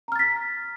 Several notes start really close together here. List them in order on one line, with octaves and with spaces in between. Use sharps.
A#5 F6 A6 B6